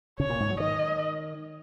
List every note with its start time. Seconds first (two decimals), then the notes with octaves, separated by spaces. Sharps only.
0.20 C#3 C#5
0.30 A#2
0.40 G#2
0.50 F#3
0.60 D#3 D#5